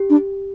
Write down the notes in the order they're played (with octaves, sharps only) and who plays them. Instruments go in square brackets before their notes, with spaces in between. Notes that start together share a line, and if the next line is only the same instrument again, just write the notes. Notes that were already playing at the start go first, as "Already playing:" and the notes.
Already playing: [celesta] G4
[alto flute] D4